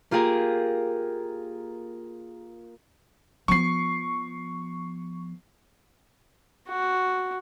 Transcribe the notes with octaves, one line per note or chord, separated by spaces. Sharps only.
A#3 F4 G4 G#4 A#4
F3 B3 C#6 C7
F#4